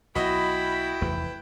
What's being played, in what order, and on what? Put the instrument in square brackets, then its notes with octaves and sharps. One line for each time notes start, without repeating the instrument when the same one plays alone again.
[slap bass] B1 [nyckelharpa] E4 G5 [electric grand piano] F#4 D#5 [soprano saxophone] B5
[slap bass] F1 E2 A3 [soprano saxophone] B4